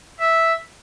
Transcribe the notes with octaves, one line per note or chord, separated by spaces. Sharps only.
E5